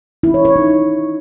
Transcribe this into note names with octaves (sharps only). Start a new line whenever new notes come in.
E4
C#5
C#5
D#4